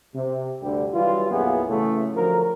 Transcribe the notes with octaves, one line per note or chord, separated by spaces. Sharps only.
C3
D2 G2 D3 G3 G4
E3 F#3 G3 F4
B1 F#2 A#3 B3 E4 G#4
A2 C#3 E3 A3
D3 F3 F#3 A#4